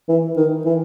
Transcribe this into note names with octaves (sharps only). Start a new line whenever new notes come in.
E3
D#3
E3